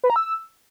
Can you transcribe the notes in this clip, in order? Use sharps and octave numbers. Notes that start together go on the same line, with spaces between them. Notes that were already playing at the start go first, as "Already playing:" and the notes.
B4
A#5
E6